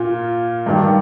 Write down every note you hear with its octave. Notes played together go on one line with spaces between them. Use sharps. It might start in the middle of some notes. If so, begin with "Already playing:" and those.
Already playing: A#2 F4
G2 D#3 G3